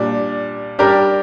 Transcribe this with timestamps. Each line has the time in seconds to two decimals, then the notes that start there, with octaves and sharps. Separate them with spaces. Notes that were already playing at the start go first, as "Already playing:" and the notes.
Already playing: A#2 G3 D4
0.79 G3 D4 G4 A#4